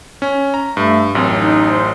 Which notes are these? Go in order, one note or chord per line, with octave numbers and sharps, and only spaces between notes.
C#4
A#5
G2 A3
A1 F#2 C4
D#4
C5